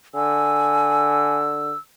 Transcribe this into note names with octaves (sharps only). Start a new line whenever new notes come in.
D3 G#5 E6